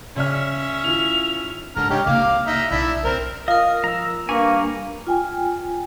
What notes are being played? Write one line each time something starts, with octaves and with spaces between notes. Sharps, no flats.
C#3 C#4 D5 E5 F6
D#3 E4 F4 F7
G#2 D3 G3 A#5 F6
C3 D#4 G4 C#5
C2 A#3 F5 D6 F6
D#4 D#5 E5
B1 D4 E4 E5
B1 C4 A#4
F4 A#4 D#5 F5 D#6
F3 A#5 E6
G3 A#3 D4 A#4 B4 G#5 C#6
F4 G5 G#5